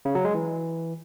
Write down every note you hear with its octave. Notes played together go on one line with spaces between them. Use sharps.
C#3
F#3
G#3
E3